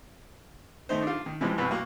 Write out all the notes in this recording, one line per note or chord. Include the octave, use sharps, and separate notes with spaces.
D#3 A3 D#4 C5
D4 F4
D#3
C3 E3 F3 G3 G#3
C2 F#2 B2 E3 B4
A#3 F#4 C#6